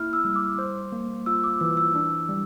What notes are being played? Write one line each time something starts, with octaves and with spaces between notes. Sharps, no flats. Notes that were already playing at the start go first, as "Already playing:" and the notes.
Already playing: A#3 E4 F6
E6
G3
D6
C5
A#3
F4 E6
D6
E3 E6
E6
D4
G3